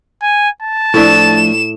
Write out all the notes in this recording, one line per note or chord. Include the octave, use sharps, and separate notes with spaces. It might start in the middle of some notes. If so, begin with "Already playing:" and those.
G#5
A5
A2 F3 A3 D4 E5 E7